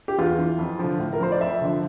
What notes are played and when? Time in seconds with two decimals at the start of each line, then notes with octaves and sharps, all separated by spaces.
0.08 G4
0.18 E2 F4
0.38 E3
0.59 F2
0.79 D3 F3
1.00 A2
1.13 A#4
1.20 F3 C5
1.32 D5
1.40 F2 E5
1.61 D3 F3